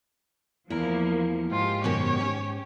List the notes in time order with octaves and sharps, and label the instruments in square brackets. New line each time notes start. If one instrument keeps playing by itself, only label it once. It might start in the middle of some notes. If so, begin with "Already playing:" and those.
[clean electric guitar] E2 A#4 [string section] F3 A#3 [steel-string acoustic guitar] E4
[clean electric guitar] G#2 [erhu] F4 [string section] G4
[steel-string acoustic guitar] F#2 B2 D#3 [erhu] C#5
[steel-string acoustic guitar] C#4